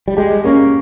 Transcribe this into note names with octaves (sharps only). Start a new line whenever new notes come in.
G3
G#3 G4
A#3 C#4